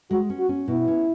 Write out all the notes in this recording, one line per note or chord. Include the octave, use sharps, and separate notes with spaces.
G#3 F#4
C#4
F#4
C#4
B2 E4
C#4